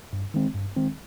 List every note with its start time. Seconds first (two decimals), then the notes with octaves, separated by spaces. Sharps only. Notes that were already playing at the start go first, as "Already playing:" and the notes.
0.13 G2
0.34 D#3 G#3 C4
0.55 G2
0.76 D#3 G#3 C4